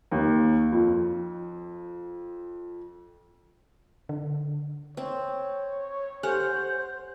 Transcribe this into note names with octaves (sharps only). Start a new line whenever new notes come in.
D#2
F2
D3
C4 C#5
G4 A4 C5 F#5 G#5